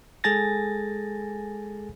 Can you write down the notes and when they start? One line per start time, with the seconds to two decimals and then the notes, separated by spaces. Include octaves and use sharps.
0.24 G#3 G#4 A4 G#5 A6 A#6